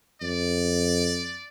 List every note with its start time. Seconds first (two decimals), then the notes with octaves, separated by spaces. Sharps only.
0.22 F2 D5